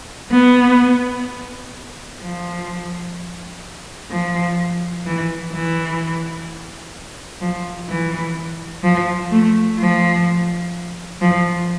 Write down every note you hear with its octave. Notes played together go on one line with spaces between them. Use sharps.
B3
F3
F3
E3
E3
F3
E3
F3
A3
F3
F3